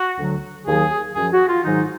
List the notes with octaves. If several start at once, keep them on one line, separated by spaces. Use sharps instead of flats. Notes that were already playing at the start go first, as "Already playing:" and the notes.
Already playing: F#4
D2 D3 F#3
D#2 D#3 F#3 G#4
F#2 F3 G#4
F#4
F4
G#2 D#3 F#3 D#4